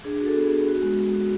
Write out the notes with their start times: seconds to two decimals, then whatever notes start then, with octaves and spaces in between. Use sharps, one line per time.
0.04 D4 G#4
0.20 F#4
0.26 A4
0.36 B3
0.47 B3 G#4
0.68 F#4
0.82 G#3
0.99 F#4
1.13 F#4